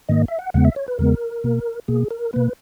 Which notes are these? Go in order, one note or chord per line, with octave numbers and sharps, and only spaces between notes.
G#2 D#3 A#3 D#5
E5
F#5
E2 C#3 G#3 B3 F#5
E5
C#5
B4
E2 C#3 G#3 B3 A#4
B2 A#3
B2 A#3 G#4
A#4
B2 A#3 B4